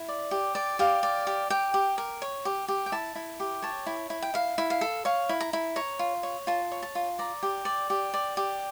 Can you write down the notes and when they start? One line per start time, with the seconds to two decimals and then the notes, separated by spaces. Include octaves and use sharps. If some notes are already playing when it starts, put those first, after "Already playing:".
Already playing: E4
0.08 D5
0.31 G4
0.55 D5
0.79 G4 F5
1.03 D5
1.27 G4
1.50 G4 G5
1.74 G4
1.98 A#4
2.22 C#5
2.45 G4
2.68 G4
2.86 G5
2.92 E4 A5
3.15 E4
3.40 G4
3.62 C#5 A5
3.86 E4
4.10 E4
4.22 G5
4.34 E4 F5
4.58 E4
4.70 F5
4.81 A4
5.05 C#5 F5
5.29 E4
5.41 A#5
5.53 E4
5.76 C#5 A#5
5.99 F4
6.23 C#5
6.47 F4 A5
6.72 C#5
6.82 A5
6.95 F4
7.19 D5 A#5
7.43 G4
7.65 D5
7.90 G4
8.14 D5
8.37 G4